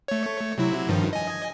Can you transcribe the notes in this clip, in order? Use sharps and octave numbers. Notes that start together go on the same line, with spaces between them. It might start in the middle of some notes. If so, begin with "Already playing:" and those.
A3 C#5
C3 F#3 E4
G2 D#3 F3
D#5 G#5